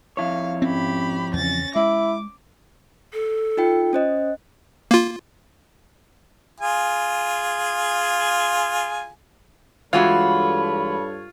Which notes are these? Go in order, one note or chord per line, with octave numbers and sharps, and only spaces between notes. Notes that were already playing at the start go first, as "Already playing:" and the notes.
F2 E4 C#5 F5
G#2 C4 C#4 G4 B5
E2 C#3 C#4 A6 A#6
G#3 E4 D6
A4
D#4 F4 G5
C#4 C5 D#5
A#3 F4
F4 G#4 G#5
G2 E3 G#3 F4 F#4 A4 C#5 B5